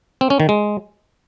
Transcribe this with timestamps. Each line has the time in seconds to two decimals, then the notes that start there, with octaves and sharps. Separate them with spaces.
0.21 C4
0.30 C#4
0.40 D#3
0.49 G#3